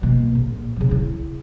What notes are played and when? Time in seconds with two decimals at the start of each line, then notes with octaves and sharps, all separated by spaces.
0.01 B2 A#3
0.35 A#1
0.76 C#3 F3
0.91 E4